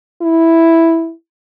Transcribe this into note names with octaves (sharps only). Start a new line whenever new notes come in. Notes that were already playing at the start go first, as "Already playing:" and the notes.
E4